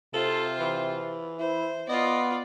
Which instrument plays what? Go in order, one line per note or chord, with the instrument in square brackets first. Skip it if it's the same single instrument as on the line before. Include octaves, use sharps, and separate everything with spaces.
[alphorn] C3 [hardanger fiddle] F4 C5 [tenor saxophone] A4
[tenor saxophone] E3
[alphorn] E4 [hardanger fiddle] C5
[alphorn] B3 [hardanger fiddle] F4 D5 [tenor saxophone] D#5